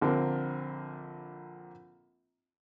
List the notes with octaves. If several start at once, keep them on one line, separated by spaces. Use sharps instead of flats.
A#1 D3 A#3 C4